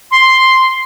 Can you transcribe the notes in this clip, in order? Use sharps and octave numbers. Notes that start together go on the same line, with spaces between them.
C6